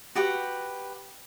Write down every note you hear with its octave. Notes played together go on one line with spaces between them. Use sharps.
F#4 G4 B4 F#5